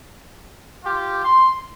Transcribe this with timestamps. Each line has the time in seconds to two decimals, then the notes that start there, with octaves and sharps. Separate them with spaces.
0.84 F4 G4
1.25 C6